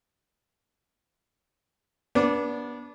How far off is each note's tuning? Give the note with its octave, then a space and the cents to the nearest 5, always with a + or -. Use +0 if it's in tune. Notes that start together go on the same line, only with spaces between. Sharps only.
B3 -30 D4 -20 D6 +0